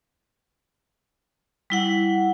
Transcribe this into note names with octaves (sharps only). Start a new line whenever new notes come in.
G3 E4 F#5